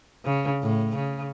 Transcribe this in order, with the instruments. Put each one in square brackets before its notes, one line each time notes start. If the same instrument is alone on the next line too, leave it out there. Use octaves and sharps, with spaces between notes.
[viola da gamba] C#3
A2
C#3